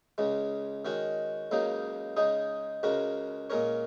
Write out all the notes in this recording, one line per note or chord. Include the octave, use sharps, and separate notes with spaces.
C#2 C#3 G#3
D#3 G#3 C#4 F#4
C#2 C#3 F#3 A#3 D#4
C#3 G#3 D#4 G#4
C#2 C#3 G#3 F#4 A#4
A#2 G#3 C#4 A#4 C#5